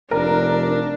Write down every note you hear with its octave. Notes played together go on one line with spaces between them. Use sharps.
F1 D4 A#4